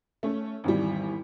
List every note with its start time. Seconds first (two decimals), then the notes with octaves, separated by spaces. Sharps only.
0.23 A3 C#4
0.64 G#1 E2 G3